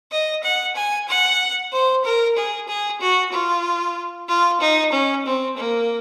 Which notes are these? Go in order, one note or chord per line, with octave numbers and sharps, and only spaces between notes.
D#5
F#5
G#5
F#5
C5
A#4
G#4
G#4
F#4
F4
F4
D#4
C#4
C4
A#3